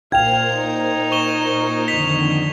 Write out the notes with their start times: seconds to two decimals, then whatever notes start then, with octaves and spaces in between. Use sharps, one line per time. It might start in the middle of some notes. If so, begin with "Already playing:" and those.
0.12 A#2 A#4 C5 F5 G5 G#6 F7
0.52 D#4
1.12 C#6 E7 G7
1.88 F2 D3 D#3 B6 F7 G7